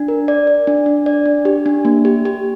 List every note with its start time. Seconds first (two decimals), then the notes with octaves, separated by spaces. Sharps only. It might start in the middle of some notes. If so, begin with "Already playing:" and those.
Already playing: D4
0.08 A#4
0.28 D5
0.47 D5
0.67 D4
0.86 D4
1.06 D5
1.26 D4
1.45 G4
1.66 D4
1.85 A#3
2.05 G4
2.25 G4